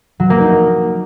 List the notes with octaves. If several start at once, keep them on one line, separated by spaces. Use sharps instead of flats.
F#3
A#3
D#4